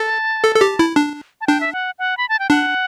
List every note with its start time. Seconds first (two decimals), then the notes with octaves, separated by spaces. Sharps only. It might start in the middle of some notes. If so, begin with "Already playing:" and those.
Already playing: A4 A5
0.44 A4
0.55 A4
0.61 G4
0.79 E4
0.96 D4
1.41 A5
1.47 D4 G5
1.61 E5
1.73 F#5
1.99 F#5
2.17 B5
2.29 A5
2.39 G5
2.50 D4 F#5